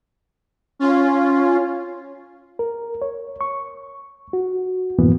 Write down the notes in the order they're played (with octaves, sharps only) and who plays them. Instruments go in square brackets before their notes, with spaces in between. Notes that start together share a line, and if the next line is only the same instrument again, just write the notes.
[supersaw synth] C#4 F4
[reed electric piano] A#4
C#5
C#6
F#4
F2 G#2 B2 E3 A#3 B3